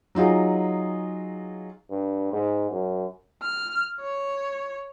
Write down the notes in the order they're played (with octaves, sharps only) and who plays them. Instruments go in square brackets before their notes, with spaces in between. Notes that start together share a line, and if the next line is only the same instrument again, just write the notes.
[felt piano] F#3 D#4 F4 G#4
[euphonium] G2
G#2
F#2
[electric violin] F6
C#5